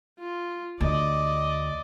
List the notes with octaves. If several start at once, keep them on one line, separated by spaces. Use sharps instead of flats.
F4
D2 D5 D#5